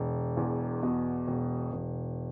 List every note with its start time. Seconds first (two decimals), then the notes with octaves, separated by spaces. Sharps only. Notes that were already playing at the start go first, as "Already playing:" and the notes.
Already playing: E1
0.37 E2
0.83 B2
1.27 E1
1.72 E1